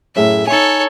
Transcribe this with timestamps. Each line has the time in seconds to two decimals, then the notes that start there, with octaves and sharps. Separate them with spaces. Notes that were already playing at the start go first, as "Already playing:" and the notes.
0.16 F#2 A2 G#4 E5
0.47 D#4 A4 C#5 G#5